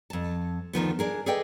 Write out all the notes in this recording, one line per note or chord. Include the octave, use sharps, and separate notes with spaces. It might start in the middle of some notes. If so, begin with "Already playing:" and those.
F2 A5
D2 D#3 F3 B3
D4 G#4 A#4
G#4 A4 B4 D5 D#5 G5